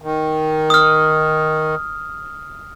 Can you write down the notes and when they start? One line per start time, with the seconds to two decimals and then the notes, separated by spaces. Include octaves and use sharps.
0.02 D#3
0.70 D#6 F6